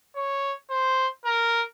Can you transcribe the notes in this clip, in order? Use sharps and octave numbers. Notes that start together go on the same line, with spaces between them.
C#5
C5
A#4